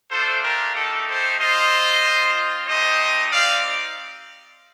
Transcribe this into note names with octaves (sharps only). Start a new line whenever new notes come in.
A3 D4 F4 A4 C5
G4 A#4
A3 D#4 G4 A4
A4 C5
C4 F4 C5 D#5
C4 F4
A3 D#4 G4 C5 D#5
C4 D#4 G4 D5 F5